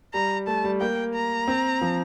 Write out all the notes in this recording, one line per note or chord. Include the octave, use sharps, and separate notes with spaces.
G3 A#5
A3 A5
G3
A#3 G5
A#5
C4
F3